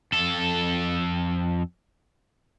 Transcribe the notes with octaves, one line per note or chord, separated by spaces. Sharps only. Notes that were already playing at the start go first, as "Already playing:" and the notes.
F2 A4